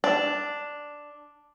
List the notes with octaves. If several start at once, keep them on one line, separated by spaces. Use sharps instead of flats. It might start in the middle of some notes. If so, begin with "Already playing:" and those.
D4